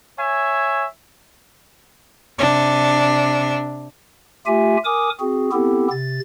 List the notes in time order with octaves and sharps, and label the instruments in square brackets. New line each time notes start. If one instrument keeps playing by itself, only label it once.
[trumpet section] C#5 E5 G#5
[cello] C3 D4
[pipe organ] A3 F4 G4 E5 G#5
A#4 G#5 D6 D#6
C4 F#4 G#4
B3 C4 E4 G4 A4
C3 A6